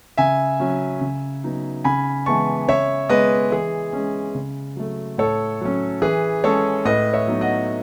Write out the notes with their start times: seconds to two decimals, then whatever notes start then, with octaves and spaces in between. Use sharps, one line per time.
0.17 C#3 E5 G#5
0.60 F#3 C#4
1.01 C#3
1.44 F#3 B3 D#4
1.84 C#3 G#5 B5
2.26 E3 G#3 B3 A5 C#6
2.68 C#3 C#5 E5
3.09 G#3 B3 B4 D#5
3.51 E3 G#4
3.93 G#3 C#4
4.35 C#3
4.76 F#3 A3
5.18 A2 A4 C#5
5.61 F#3 C#4
6.02 E3 G#4 B4
6.44 G#3 C#4 A4 C#5
6.85 A2 B4 D#5
7.14 C#5 E5
7.28 F#3 B3 D#4
7.41 D#5 F#5